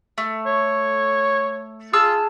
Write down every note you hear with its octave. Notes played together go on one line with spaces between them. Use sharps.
A3
C#5
F4 G#4 A5 E6